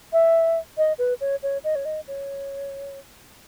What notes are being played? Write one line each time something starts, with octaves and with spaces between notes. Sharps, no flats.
E5
D#5
B4
C#5
C#5
D#5
C#5
D#5
C#5